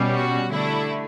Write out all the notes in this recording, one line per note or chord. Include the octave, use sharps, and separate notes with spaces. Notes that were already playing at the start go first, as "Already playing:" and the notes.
Already playing: B2 G3 C#4
F#4
D3 A3 D4 E4